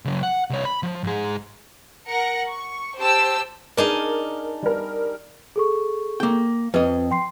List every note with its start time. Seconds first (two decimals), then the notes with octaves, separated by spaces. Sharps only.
0.05 C#3 F#3
0.23 F#5
0.50 C2 C#5
0.65 B5
0.83 F3
1.04 G#2 G#4
2.07 A#4 F#5 A#6 C#7
2.51 C#6
2.99 G4 C5 A5 E6
3.77 D4 D#4 G#4 A#4
4.63 G3 A#4
5.56 G#4 A4 C#6
6.20 A#3 G5
6.74 F2 B4 D#5
7.11 G5 C6 C7